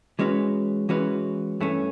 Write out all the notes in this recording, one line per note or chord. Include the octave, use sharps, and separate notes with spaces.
E3 G#3 C#4 F#4 B4
E3 G#3 C#4 F#4 B4
G2 E3 A3 C#4